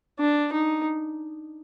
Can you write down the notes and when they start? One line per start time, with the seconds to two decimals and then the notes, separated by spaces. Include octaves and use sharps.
0.19 D4
0.53 D#4